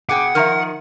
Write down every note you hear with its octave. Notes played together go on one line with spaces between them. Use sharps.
B2 G#4 F#5 G5 D6
D#3 F3 D#4 A#4 E5 A#5 F6